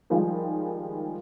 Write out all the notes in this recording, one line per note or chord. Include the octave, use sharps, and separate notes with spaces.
D#3 F3 G3 G#3 F4